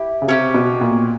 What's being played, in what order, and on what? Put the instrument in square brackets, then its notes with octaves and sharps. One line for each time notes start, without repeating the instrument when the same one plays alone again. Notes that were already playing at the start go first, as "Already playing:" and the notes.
Already playing: [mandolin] E4 G4
[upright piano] C#3
[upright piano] C3 [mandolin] C#4 E4 G4
[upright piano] B2
A#2